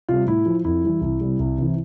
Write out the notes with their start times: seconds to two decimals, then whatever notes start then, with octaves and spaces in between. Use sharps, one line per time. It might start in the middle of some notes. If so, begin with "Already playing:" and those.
0.09 C3 G3 F4
0.27 A2 E4
0.46 F3
0.65 F2 E4
0.84 E3 G3
1.01 C2
1.21 C3 G3
1.39 C2
1.58 C3 E3